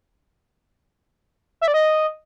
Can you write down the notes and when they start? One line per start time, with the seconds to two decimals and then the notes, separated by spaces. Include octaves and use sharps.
1.61 E5
1.68 D5
1.74 D#5